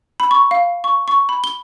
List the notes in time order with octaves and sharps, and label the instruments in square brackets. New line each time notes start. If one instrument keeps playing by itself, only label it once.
[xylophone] B5
C#6
F5
C#6
C#6
B5
G7